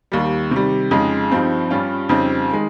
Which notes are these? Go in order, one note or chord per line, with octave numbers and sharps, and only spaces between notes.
D#2 D#3 G3
C3 D#3 G3
F2 C#3 G#3 D#4
G2 F3 C4 D#4
G2 G3 C#4 F4
F2 C#3 G3 C4 D#4
D#3 G#3